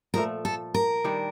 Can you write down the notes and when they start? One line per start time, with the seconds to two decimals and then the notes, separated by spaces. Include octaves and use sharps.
0.14 A#2 F3 A3 A#4
0.45 A4
0.74 A#4
1.04 D#3 G3 D4